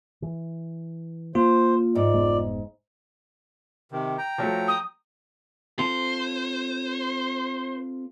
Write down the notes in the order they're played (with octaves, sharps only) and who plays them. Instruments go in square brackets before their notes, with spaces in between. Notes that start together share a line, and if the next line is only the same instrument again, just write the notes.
[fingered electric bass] E3
[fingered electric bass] A#3 [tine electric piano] F4 [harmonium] C5
[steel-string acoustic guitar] G#2 [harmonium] D5
[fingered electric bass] F1 G#3 B3
[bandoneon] C3 D#3
G5 A#5
[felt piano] F3 F#3 A3
[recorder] D#6
[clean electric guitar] C4 F4 A4 [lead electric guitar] C5